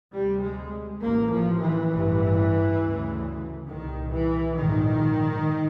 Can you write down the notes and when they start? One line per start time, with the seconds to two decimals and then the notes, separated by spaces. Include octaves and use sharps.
0.13 D2 C3 G3
0.42 G#3
1.02 A1 A2 A#3
1.31 F3
1.61 E3
1.90 A1 G2
2.79 D2 C#3
3.68 C2 A#2 D#3
4.11 E3
4.56 A#1 G#2 D#3